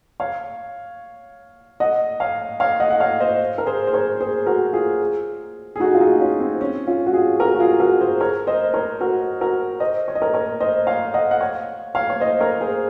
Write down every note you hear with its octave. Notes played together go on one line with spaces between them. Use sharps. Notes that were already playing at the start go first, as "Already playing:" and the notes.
C#5 F5
D#5 F#5
C#5 F5
C#5 F5
D#5 F#5
F#5
C#5 F5
C5 D#5
A#4
G#4 C5
C5
A#4 C#5
G#4 C5
F#4 A#4
F4 G#4
G#4
D#4 F#4
F4
D#4 F#4
C#4 F4
C4
C#4
C#4 F4
F#4
F4 G#4
F#4 A#4
F#4
F4 G#4
F#4 A#4
G#4 C5
A#4 C#5
C5 D#5
A#4 C#5
F#4 A#4
F#4 A#4
C5 D#5
C#5
D#5
A#4 C#5
A#4 C#5
C5 D#5
C#5 F5
D#5 F#5
F#5
C#5 F5
C#5 F5
C#5
C5 D#5
A#4 C#5
G#4 C5